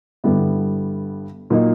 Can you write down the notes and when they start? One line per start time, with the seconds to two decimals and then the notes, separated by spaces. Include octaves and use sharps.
0.24 G2 D3 G3 B3 E4
1.50 A#2 F#3 A#3 D#4